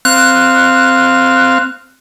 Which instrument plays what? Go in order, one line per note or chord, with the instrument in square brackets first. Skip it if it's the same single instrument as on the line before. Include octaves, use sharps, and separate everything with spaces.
[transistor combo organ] C4 F5 [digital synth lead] F#6